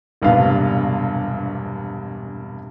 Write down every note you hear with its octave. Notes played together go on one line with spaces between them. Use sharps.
E1 A#1 G2 C3 B3 F5